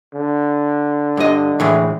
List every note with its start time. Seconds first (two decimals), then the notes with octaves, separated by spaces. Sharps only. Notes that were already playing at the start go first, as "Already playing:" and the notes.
0.14 D3
1.17 G2 D#5
1.60 A2 E3 G#3